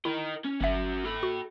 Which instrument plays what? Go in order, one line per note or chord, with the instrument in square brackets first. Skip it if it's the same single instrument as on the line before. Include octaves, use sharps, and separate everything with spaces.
[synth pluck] E4 [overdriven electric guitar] A#4 D#5
[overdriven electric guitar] C#4
[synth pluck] G1 E5 [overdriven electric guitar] C#4 F#4
[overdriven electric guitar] A4 B5
[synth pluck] F#4